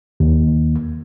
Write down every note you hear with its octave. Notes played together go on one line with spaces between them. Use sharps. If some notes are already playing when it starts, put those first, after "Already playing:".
D#2